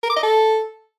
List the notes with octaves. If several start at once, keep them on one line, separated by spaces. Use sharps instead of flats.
A#4
D6
D#5
A4